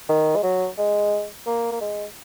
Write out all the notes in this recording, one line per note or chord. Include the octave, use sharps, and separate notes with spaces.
D#3
G#3
F#3
G#3
A#3
A#3
G#3